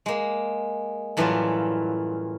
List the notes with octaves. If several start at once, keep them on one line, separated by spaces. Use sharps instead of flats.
G#3 A#3
F#2 A2 E3 F#3 G3 F4